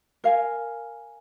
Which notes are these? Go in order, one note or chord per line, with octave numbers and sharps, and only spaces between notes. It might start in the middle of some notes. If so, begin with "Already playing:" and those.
A#4 F5 G#5